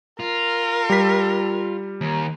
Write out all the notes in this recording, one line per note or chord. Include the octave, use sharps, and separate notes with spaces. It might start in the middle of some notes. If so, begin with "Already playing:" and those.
F4 A#4
G3 B6
D#2